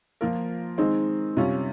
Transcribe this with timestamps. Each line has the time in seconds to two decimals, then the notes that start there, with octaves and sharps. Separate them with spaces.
0.21 F3 A#3 F4 A#4
0.78 D#3 G#3 C4 D#4
1.37 C3 G3 C#4 F4